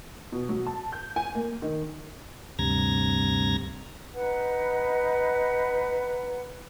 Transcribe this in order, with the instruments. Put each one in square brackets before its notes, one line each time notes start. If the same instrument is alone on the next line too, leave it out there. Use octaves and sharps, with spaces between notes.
[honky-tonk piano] B2
F#3
A5
G6
G#5
A#3
D#3
[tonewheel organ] D2 G2 C3 A#5 G#6 A#6
[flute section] D#4 B4 F#5